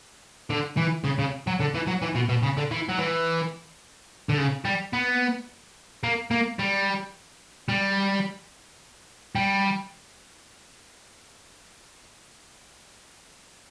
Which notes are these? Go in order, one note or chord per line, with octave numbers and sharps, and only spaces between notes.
D3
E3
C#3
C#3
F#3
D3
E3
F#3
E3
B2
B2
C#3
D3
E3
F#3
E3
D3
C#3
G3
B3
A#3
A#3
G3
G3
G3